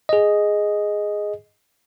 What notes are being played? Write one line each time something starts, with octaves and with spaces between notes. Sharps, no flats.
G#4 D#5